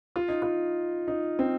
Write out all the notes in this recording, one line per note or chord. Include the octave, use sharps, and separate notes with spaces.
F4
D#4
F4
D#4
C4